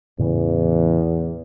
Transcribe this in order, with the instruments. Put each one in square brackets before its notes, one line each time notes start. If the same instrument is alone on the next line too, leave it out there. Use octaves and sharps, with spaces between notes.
[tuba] E2 [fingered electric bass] A2 C#3 E3